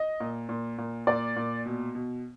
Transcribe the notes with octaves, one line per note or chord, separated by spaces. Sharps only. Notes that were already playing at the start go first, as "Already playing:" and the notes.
Already playing: D#5
A#2
A#2
A#2
A#2 D5
A#2
B2
B2